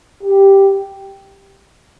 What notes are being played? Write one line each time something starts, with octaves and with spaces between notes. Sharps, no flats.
G4